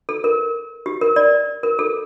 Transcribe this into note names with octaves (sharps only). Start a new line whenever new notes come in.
A4
A#4
G4
A#4
D5
A#4
A4